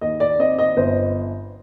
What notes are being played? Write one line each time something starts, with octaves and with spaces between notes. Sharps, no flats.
D#2 D#5
D5
C4 D#5
D#5
G1 C5